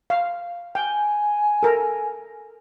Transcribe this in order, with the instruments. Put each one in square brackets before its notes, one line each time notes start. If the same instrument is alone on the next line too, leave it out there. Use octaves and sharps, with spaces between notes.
[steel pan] F5
[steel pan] G5 [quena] G#5
[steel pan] A4 A#4